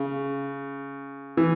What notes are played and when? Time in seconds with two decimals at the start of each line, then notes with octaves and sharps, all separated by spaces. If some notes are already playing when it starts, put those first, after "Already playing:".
Already playing: C#3
1.37 E3